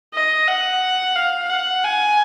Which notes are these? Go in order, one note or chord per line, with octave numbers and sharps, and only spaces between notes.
D#5
F#5
F5
F#5
G#5